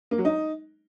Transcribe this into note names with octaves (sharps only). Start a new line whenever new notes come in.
A#3
F#3
D#4